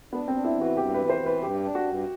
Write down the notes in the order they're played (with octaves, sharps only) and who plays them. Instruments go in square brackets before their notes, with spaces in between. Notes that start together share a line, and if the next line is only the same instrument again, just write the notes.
[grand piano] B3 [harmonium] D4
[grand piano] C4
[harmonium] D4
[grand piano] E4
[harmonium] E3
[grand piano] F#4
[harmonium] G2 [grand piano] G4
[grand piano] B4
[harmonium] E3
[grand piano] C5
[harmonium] E3
[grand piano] B4
[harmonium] G2 [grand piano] G4
[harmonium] D4
[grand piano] F#4
[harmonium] G2